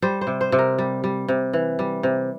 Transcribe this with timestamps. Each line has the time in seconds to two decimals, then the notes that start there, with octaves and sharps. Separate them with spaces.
0.02 G3 C5
0.21 C5
0.27 C3
0.41 C5
0.52 C3
0.59 A#4
0.78 G3
1.04 G3
1.28 C3
1.53 E3
1.79 G3
2.03 C3